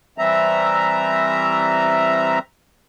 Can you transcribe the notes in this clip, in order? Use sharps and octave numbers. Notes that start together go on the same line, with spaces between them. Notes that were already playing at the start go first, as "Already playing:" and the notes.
E3 G3 C4 E5 A#5